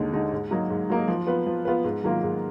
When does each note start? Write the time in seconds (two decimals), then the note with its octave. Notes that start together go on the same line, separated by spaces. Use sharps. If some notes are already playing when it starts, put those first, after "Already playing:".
Already playing: D#2 D3 G#3 D#4
0.13 D3 G#3 D#4
0.32 G#2
0.51 F#3 A#3 D#4
0.70 G#2
0.90 F#3 A#3 D#4
1.08 F3
1.27 B3 F4 B4
1.47 F3
1.65 B3 F4 B4
1.84 G#2
2.04 D#3 F#3 A#3 F4
2.23 G#2